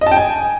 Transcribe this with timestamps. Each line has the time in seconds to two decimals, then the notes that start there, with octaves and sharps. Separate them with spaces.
0.01 D#5
0.06 A5
0.11 G5
0.17 G#5